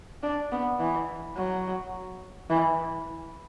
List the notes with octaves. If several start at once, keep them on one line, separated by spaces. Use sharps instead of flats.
D4
B3
E3
F#3
E3